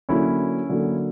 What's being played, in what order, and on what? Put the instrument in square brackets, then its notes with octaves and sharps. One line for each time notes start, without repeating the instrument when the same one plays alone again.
[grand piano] D3 F#3 A#3 C#4 E4
D3 F#3 A#3